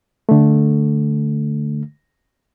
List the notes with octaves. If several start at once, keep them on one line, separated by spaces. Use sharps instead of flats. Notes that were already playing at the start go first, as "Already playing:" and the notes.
D3 A3